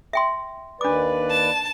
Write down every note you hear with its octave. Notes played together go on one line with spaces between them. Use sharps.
E5 G5 C6
D#2 D4 B4 D5 D6
A5